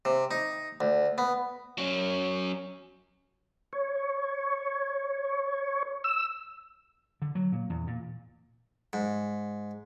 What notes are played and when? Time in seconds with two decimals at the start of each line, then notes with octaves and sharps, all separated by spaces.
0.05 C3
0.31 D#4
0.81 D2
1.18 B3
1.78 F#3 C#4
3.73 C#5
6.04 E6
7.22 D3
7.35 F#3
7.52 A#2
7.70 E2
7.87 A#2
8.93 G#2